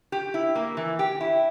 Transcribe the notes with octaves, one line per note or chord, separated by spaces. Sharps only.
G4
E4
A#3
E3
G4
E4